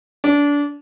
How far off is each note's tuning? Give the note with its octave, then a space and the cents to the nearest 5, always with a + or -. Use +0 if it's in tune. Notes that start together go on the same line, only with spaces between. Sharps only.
D4 -25